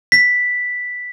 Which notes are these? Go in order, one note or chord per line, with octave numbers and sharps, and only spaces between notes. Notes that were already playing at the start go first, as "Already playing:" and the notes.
B6